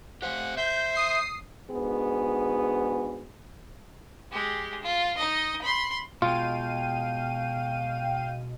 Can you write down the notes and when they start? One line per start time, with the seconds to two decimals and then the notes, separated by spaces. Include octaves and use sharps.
0.22 G4 C5 F5 F#5
0.57 C5 E5 G6
0.94 D#6 C7
1.69 G#2 D3 B3 F#4 G#4
4.32 G#3 G4
4.83 F4
5.18 D#4 D#5
5.62 B5 C6
6.22 B2 G#3 F4 F5 G5 D#7